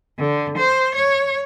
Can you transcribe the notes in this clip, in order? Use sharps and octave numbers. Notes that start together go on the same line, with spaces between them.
D3
C5
C#5